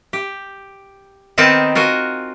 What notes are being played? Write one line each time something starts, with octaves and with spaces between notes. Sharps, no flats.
G4
D#3 B3 C4 D#4 A#4 A5
F4 F#4 A#4 G#5